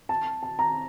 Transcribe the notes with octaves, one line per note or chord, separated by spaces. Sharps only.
A5
A5
A#5